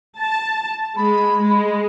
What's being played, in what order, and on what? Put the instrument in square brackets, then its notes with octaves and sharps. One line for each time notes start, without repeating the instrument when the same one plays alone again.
[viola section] A5
[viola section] G#3 [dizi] B5
[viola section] G#3